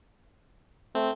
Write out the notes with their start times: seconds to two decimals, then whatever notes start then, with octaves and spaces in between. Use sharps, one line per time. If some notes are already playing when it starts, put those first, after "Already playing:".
0.95 A3 C4